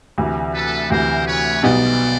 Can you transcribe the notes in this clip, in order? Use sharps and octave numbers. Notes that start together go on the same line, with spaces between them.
D2 C3 E3
A4 B4
D2 C3 E3 A#4 C5
B4 C#5
B1 B2 G3 B3 D#4 C5 D5